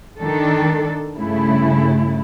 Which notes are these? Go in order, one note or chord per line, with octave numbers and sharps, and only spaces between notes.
D#3 D4 A4
G2 C#3 A3 E4